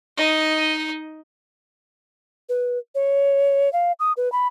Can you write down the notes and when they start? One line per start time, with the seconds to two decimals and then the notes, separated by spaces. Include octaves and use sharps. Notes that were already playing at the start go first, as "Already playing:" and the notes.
0.17 D#4 D#5
2.49 B4
2.95 C#5
3.73 F5
4.00 D#6
4.17 B4
4.32 B5